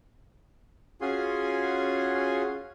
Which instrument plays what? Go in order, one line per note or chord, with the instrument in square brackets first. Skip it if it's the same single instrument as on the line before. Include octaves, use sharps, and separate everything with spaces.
[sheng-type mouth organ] C#4 F4 F#4 G#4 G#5 C6